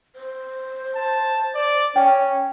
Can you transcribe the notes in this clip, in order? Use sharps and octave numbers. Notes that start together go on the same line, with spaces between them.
C5
A5
D5
C#4 C#5 G5